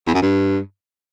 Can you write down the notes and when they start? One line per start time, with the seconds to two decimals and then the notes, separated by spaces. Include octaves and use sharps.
0.06 E2
0.14 F#2
0.22 G2